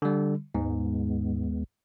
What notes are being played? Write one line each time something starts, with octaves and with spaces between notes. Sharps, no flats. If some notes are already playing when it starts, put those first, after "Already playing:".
D3 G3
D#2 G#2 G#3 B3